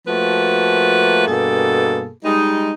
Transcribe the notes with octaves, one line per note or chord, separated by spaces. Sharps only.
F3 A3 A#3 F#4 B4
G2 B2 A#3 G#4 A4
G3 G#3 D#4